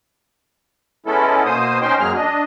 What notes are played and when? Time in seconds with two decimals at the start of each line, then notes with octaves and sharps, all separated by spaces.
1.06 G#3 B3 C#4 E4 A4
1.45 B2 A#3 C5 D#6
1.81 C#4 D#4 C5 G5 C6
2.00 F#2 F#3 G#3 A#3 G#4 F6
2.15 D4 D#5